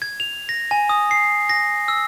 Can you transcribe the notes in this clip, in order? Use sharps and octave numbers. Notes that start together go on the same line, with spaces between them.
G#6
F7
A#6
G#5
D#6
C7
A#6
E6